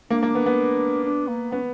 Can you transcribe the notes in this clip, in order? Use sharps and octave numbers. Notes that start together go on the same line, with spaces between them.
A#3 D4
A#3
B3
B3
D4
A#3
B3 C#4